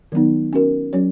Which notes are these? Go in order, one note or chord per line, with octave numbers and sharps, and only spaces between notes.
D#3 F#3 B3 D#4
C#4 F#4 A#4
F#3 C#4 F#4 C#5